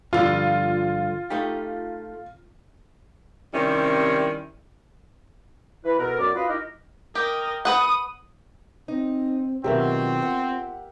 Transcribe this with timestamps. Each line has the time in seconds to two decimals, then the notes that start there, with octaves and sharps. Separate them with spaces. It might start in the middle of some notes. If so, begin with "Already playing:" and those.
0.13 G2 D3 F3 F4
1.30 A3 D#4 G4
3.54 C3 D#3 G3 C4 C#4 E4
5.85 E3 E4 B4
5.99 B2 A4 A#4
6.20 F#2 F#4 D5 D6
6.35 F4 F#4 B4 D#5 F5
6.49 D#4 E4 G4 A#4 D#5
7.15 G4 A#4 D#5
7.65 B4 F#5 D#6
8.88 C4 D#4
9.64 B2 D#3 F#3 C4 F4 G4 A#4 E5
10.22 F#5